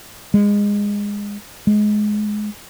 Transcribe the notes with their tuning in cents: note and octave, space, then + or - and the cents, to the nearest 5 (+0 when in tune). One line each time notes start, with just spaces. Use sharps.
G#3 -20
G#3 +20